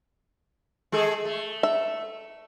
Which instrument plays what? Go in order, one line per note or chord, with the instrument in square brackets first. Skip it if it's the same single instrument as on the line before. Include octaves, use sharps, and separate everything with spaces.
[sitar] G#3 G#4 A4
A3
[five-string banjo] E5